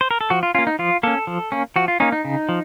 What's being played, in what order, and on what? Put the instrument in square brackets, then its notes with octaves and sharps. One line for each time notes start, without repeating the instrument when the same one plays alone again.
[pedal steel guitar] C5
A#4
A4
F3 F#4
F4
C#4 F4
A#3
D#4
F3 F4
A#3 C#4 A4
F3
A#3 C#4
F3 F#4
F4
A#3 C#4 D#4
D#4
C#3
F3